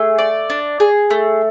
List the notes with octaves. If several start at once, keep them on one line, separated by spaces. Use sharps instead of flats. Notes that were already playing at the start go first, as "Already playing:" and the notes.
Already playing: A3 G#4
D5
D4
G#4
A3